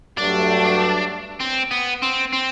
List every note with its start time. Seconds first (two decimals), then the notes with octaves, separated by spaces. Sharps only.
0.18 G2 F#3 A3 D4
1.40 C4
1.71 B3
2.03 C4
2.33 C4